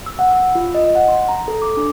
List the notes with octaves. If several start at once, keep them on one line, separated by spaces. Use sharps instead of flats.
E6
F#5
E6
F4
D#5
F#5
C6
A#5
A4
D6
D4